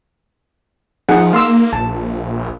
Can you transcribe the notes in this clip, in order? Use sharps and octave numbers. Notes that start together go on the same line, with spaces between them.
F3 D#4 G#4 F#5
A#3 F5 C6 E6
A#1 A5